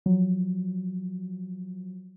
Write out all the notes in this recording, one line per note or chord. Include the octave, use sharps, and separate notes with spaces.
F3 F#3